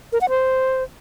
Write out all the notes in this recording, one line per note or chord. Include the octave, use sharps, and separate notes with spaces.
A#4
F#5
C5